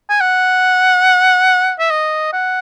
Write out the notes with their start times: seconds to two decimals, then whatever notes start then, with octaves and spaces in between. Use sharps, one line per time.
0.09 G#5
0.21 F#5
1.79 E5
1.90 D#5
2.33 F#5